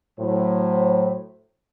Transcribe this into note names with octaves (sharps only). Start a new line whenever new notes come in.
A2 F#3 C5